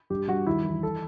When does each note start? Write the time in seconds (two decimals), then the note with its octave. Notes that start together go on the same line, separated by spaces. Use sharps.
0.10 G2 G4
0.28 G2 F#4
0.46 D#2 E4
0.64 E3
0.83 A4